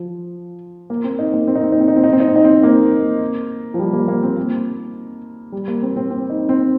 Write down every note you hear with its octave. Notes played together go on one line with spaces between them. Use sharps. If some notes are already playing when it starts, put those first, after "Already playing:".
Already playing: F3
A#3
C4
D#4
A#3
C4
D#4
C4
D#4
C4
D#4
C4
D#4
C4
D#4
C4
D#4
C4
A#3
F3
G3
A#3
A#3
C4
A#3
G3
A#3
C4
C4
C4
D#4
C4